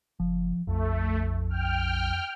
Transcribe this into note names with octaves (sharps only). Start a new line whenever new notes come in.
F#1 F3
A#1 F2 A3
G5 F6